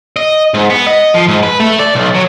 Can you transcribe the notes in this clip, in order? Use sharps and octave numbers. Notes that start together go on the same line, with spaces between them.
D#5
G#2
B3
D#5
F3
G#2
B4
A3
D5
B1
F#3